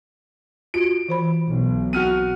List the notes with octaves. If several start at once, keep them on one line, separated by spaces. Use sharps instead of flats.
F4 F#4 D7
E3 C5 B5
B1
C4 F#4 F#5 F6 D#7